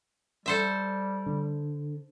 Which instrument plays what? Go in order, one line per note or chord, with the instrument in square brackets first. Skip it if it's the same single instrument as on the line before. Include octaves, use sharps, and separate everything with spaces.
[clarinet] G3 [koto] A4 C5 E5
[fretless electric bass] D3